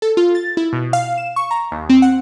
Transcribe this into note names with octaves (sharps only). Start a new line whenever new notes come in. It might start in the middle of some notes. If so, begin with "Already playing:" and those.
A4
F4
A6
E4
B2
F5
E7
C#6
A#5
D#2
C4
F#5